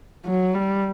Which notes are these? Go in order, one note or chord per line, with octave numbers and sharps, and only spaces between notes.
F#3
G3